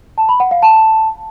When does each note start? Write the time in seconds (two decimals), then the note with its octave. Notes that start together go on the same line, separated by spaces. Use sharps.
0.18 A5
0.29 B5
0.40 F#5
0.51 F5
0.62 A5